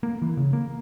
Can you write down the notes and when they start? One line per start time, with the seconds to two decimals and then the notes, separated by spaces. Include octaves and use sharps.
0.03 A#3
0.22 E3
0.37 C#3
0.53 A#3